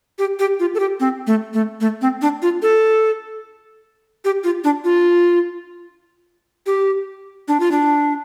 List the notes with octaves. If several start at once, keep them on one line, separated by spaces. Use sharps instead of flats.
G4
G4
F4
A4
G4
C4
A3
A3
A3
C4
D4
F4
A4
G4
F4
D4
F4
G4
D4
F4
D4